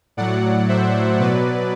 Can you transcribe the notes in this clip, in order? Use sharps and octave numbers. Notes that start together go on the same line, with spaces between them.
A2 F#3 D5 F#5
C5 E5
B2 F#3 B4 D5